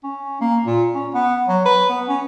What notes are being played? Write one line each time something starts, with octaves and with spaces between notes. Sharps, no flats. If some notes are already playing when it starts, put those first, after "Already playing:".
C#4
A#3
A#2
C#4
B3
F#3
B4
B3
C#4